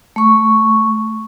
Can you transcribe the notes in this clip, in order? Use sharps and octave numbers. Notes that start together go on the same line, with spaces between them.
A3 C#6